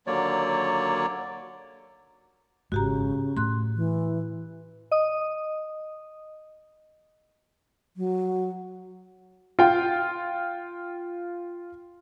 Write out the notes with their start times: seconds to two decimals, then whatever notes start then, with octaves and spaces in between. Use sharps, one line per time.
0.07 D#2 D3 F#3 A#3 C#5 D5
2.72 G#1 G#2 C#3 G#3 F#4 G4 A#5
3.37 A2 A3 C6 F#6
3.76 E3
4.92 D#5 D#6
7.97 F#3
9.59 F4 G5